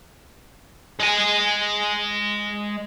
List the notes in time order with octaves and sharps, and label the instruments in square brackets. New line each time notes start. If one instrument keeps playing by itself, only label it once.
[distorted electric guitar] G#3 G#5